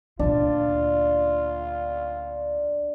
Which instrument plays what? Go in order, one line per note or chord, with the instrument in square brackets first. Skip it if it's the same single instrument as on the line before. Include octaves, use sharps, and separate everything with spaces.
[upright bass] D2 A#2 [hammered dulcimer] D4 [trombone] F4